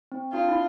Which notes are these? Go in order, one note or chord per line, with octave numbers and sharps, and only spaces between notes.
C4
D4 F4
E4